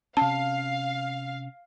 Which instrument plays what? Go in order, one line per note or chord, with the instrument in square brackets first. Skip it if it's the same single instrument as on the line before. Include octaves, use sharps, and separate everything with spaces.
[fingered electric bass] C3 C#4 [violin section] F5 [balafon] A5